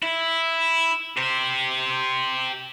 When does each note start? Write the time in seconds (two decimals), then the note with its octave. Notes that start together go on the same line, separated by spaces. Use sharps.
0.03 E4
1.17 G4 C5